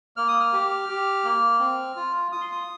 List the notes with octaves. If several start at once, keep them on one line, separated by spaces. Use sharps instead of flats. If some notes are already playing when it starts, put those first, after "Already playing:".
A#3 F6
D#6
F6
G4
G4
A#3
C4
F4
F4 D#6
C6
D#6